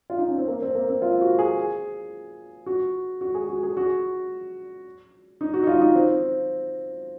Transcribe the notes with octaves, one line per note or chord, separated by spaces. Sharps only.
F4
D#4
C#4
C4
A#3
C4
A#3
C4
F4
F#4
G#4
F#4
F#4
G#4
F#4
G#4
F#4
D#4
F#4
D#4
F4
D#4
C4